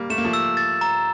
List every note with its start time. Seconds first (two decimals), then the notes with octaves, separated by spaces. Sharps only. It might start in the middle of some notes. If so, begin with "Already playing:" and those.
Already playing: G3 A#3
0.10 A3 E7
0.18 A#3
0.25 F3 A3
0.33 E6
0.57 A6
0.81 A#5